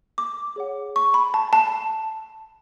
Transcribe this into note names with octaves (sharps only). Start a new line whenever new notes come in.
D6
G#4 C#5 F#5
C#6
B5
A5
A5